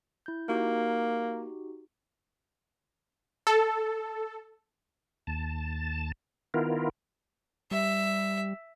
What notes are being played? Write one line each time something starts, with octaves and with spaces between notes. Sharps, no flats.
E4 G6
A#3 D#4 F#4 G4
A4
D#2 A5
D#3 B3 E4 F4 A#4
G3 E5